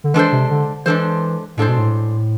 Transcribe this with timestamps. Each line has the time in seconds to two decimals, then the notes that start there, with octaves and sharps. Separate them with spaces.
0.04 D3
0.14 E3 G#3 D4 A4 C5
0.32 C3
0.51 D3
0.86 E3 G#3 D4 A4 C5
1.57 A2 G#3 D4 A4 C5
1.68 B2
1.78 A2